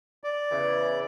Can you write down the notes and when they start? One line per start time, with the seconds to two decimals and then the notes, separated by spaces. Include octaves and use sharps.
0.24 D5
0.50 E2 C#3 E3